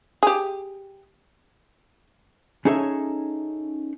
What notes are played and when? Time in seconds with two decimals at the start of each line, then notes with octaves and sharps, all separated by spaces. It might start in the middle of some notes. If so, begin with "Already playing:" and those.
0.23 G4 G#4
2.65 C#4 D#4 G#4 A4 C#5 E5